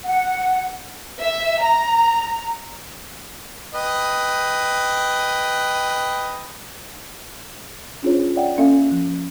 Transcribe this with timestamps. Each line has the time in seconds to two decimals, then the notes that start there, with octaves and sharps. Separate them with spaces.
0.05 F#5
1.20 E5
1.62 A#5
3.74 B4 D#5 G5
8.03 C#4 D4 F4 G#4 C5 C#5
8.36 C#5 D5 E5 F#5 G5
8.58 A#3 C#4 A4 E5 F5 G#5
8.91 F3